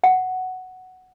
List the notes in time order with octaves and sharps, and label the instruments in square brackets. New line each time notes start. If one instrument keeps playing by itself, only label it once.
[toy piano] F#5